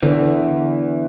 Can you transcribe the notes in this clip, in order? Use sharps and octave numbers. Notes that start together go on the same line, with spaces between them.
E2 D3 E3